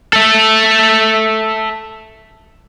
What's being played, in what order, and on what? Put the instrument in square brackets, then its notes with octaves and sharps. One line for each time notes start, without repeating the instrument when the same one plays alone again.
[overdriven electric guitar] A4 E5